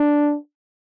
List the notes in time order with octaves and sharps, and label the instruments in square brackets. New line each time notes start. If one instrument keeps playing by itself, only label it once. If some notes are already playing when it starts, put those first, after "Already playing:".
Already playing: [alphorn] D4